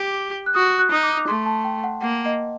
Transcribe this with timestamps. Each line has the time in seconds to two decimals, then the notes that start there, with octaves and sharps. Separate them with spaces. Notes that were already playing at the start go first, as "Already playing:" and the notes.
Already playing: G4 D6
0.46 F#6
0.55 F#4 D#6
0.79 F#6
0.91 D#4 D#6
1.03 D6
1.20 D6
1.28 A3 C6
1.46 A5
1.64 G5
1.84 F#5
2.02 A#3 F#5
2.26 D#5